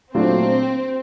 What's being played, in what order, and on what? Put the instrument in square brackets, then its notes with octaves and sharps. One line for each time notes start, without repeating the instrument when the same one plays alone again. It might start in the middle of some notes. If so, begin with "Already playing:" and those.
[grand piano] A#2 F#3 A3 D4 F4 [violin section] C4